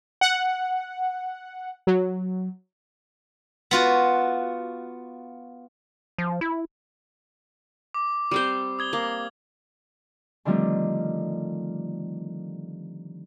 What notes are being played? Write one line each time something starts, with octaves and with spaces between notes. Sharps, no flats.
F#5
F#3
B3 F4 F#4
F3
E4
D6
G3 C4 C5
D#6 G#6 G7
A#3
D3 D#3 F3 G3 A3 C4